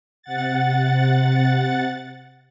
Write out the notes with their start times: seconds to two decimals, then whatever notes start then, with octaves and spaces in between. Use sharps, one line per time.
0.23 C3 F#5 A6